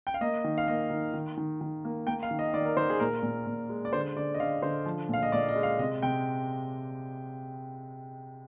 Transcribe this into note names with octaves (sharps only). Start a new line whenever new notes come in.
G5
F5
A#3 D#5
D#3
F5
A#3 D#5
D#3
D#3
D#3
D#3
A#3
A#3 G5
F5
D#3
D#5
D#3 D5
A#4
D#3 C5
G#4
A#2 A#4
A#2
A#2
G#3
D5
D3 C5
D3 D5
D#5
D3 F5
D3 C5
F3
A#2 F5
D#5
A#2 D5
D#5
G#3
F5
C3 D#5
C3 G5